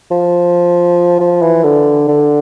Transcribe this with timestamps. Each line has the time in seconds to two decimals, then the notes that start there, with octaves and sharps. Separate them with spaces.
0.11 F3
1.20 F3
1.42 E3
1.64 D3
2.08 D3